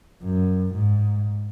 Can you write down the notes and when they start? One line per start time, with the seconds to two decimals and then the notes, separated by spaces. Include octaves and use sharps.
0.23 F#2
0.75 G#2